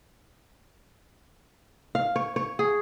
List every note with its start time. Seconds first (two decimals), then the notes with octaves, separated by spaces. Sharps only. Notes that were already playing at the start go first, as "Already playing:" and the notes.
1.95 F5
2.16 C#5
2.36 C#5
2.59 G#4